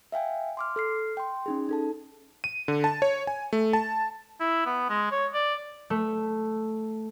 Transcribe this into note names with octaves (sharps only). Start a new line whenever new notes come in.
E5 F5 G5 G#5
C6 D6 F6
A4 F6 C7
G5 C6
C#4 D#4 G#4
D#4 A4 A5
D#7
D3
A5
C#5
G#5
A3
A5
E4
B3
G#3
C#5
D5
A3